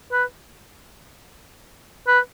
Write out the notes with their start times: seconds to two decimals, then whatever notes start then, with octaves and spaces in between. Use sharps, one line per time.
0.12 B4
2.07 B4